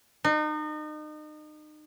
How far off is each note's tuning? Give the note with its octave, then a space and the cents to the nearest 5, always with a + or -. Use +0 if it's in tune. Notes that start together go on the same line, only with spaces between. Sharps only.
D#4 -35